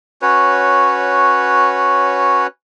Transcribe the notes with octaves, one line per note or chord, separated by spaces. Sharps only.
C#4 F#4 B4 C#5